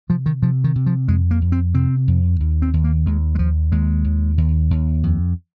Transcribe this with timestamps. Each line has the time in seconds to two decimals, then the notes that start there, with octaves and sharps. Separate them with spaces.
0.09 C3 F3
0.26 D#3
0.42 C3 F3
0.64 D#3
0.76 C3
0.86 F3
1.08 F2 G#3
1.31 A#3
1.41 F2
1.52 C4
1.74 C3 C4
2.08 F2
2.40 D#2
2.62 C4
2.73 D#2
2.84 A#3
3.06 D#2 G#3
3.35 G#3
3.39 D#2 F3
3.72 D#2 G#3
4.04 D#2
4.38 D#2
4.70 D#2
5.03 F2